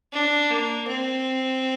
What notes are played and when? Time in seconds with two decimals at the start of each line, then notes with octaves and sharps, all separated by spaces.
0.13 D4
0.50 A#3
0.88 C4